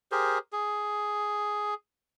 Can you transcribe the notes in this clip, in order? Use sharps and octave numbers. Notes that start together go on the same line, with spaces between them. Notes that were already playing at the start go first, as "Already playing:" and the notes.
G4 G#4 A#4 C5
G#4